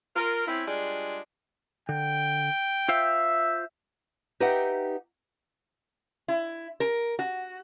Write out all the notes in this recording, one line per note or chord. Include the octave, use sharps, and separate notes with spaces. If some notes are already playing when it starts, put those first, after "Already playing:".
F4 A#4
C4 C#4 E4
G3 G#3 D4 F4 G#4
D3 G5
F4 C5 E5 F5
D#4 G4 B4 E5 F#5 G5
E4
A#4
F#4